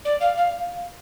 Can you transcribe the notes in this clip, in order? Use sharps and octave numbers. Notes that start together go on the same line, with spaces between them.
D5
F5
F5